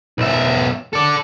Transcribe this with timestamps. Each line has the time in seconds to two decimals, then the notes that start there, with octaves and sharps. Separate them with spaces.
0.18 B1 E5
0.93 A4 D5